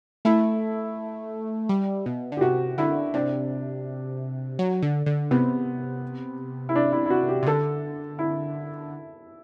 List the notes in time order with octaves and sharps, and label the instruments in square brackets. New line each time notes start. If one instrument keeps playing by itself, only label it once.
[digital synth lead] A3 [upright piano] E4
[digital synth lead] G3
B2
D3
[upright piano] G4
[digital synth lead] C3 [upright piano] F#4
[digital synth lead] D3 [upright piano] E4
[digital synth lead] C3 [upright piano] D4
[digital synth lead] F#3
D3
D3
[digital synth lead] C3 [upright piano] B3
[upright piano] E4
D4
E4
E4
F#4
G4
[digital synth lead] C3
[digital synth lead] D3 [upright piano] A4
[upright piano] E4